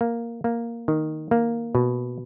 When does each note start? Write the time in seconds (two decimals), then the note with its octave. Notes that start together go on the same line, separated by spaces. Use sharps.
0.01 A#3
0.44 A#3
0.88 D#3
1.31 A#3
1.75 B2